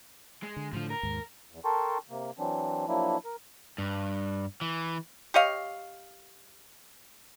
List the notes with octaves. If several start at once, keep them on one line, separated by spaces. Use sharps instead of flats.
G#3
D3
A2 D3 F3 F4
A#4
D#2 G#2
E2
A4 A#4 G5 A5 C6 C#6
C3 A#3
E3 F#3 C4 D4
F3 F#3 A#3 D4 E4
A#4
G2
E3
G4 C#5 D#5 F5